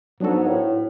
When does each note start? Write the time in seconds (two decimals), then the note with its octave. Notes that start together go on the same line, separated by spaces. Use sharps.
0.20 G#2 F#3 B3 D4 F#4 A4
0.47 A2